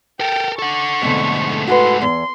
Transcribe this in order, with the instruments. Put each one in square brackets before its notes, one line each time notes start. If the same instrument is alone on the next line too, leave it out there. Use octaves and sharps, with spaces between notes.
[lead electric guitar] A4 A#4 [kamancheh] G5
[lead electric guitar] A4 F#5 [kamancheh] C#6
[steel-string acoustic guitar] F2 B2 D3 [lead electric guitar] G#2 A3
[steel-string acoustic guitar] F#4 A4 B4 [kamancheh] F#5 C6
[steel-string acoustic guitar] E2 [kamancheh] C6